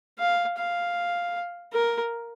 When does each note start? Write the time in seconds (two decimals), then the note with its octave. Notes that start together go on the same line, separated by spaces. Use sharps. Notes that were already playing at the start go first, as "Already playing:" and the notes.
0.19 F5
0.58 F5
1.73 A#4